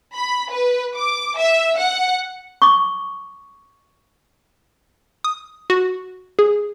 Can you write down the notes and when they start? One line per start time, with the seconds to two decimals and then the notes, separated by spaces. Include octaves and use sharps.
0.14 B5
0.50 B4
0.96 D6
1.38 E5
1.78 F#5
2.62 C#6 D6
5.24 D#6
5.70 F#4
6.39 G#4